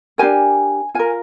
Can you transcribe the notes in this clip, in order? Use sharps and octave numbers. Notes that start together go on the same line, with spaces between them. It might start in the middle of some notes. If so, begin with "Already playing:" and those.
D4 G4 A#4 G#5
F4 A#4 G#5